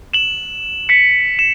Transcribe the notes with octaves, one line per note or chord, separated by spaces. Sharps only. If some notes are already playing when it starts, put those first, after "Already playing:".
E7 F#7
B6 C#7
E7